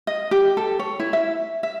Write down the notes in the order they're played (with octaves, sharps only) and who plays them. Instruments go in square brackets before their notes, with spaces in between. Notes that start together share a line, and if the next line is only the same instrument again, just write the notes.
[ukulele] D#5
G4
A4
C#5
E4
E5
E5